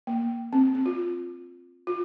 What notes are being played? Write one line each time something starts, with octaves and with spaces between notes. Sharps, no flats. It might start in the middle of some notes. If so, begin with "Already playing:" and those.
A#3
C4
C4
F4
F4